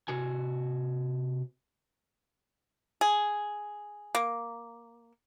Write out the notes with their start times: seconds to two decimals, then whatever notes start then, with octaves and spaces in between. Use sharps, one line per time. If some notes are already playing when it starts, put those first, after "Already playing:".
0.08 C3 F#4 G#5
3.01 G#4
4.15 A#3